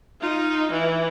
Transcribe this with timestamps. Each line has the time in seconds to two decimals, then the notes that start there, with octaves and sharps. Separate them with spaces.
0.21 D#4 F4
0.71 E3